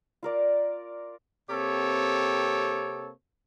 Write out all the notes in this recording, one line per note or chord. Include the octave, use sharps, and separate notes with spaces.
F4 A#4 D5
C3 A#3 C4 G4 A4 C#5